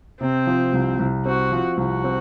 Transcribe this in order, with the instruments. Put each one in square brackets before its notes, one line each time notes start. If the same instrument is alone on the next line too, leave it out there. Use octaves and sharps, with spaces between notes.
[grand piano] C3 [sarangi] C4
[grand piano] F3
C2
C2
[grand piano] C4 [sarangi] F#4
[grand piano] F3
[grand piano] C2 [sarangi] F#4
[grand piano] C4